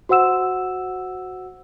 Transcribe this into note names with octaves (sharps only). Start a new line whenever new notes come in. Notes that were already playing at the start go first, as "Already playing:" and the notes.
F#4 C5 F#5 E6 E7